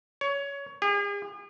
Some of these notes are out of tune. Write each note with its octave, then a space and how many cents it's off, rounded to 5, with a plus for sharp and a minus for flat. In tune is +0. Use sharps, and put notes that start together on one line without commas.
C#5 +20
G#4 -45